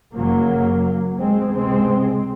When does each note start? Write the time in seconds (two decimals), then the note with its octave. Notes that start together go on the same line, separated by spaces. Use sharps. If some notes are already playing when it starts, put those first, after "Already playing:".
0.15 F#1 F#2 C#3 F#3 A#3
1.18 G#3 C4
1.52 C#2 C3 G#3 C4